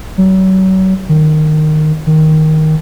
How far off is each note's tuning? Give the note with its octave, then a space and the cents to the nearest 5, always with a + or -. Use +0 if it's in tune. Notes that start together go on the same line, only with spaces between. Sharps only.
F#3 +35
D#3 -15
D#3 +5